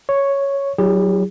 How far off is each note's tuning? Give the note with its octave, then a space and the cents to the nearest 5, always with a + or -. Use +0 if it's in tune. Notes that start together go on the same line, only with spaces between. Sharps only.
C#5 +0 C#6 +0
F#3 +15 E4 +0 G#4 -45